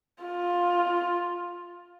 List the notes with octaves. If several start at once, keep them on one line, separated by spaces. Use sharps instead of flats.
F4